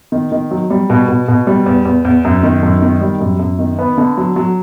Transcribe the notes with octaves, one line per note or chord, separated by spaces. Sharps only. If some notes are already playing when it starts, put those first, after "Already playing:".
D#3
D#3
F#3
G3
B2
B2
B2
G3
E2
E2
E2
F#2
D#3
F#2
D#3
G3
F#2
F#2
D#3
B3
D3
F#3
F#3